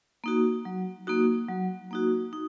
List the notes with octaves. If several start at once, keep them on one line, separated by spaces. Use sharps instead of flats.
A#3 D#4 F#4
F#3
A#3 D#4 F#4
F#3
A#3 D#4 F#4
D#4